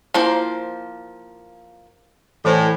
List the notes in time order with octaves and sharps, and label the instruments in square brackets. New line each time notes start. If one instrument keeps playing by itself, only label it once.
[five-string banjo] F3 A#3 C5 [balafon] E4
[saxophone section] A2 [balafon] E3 C5 G#5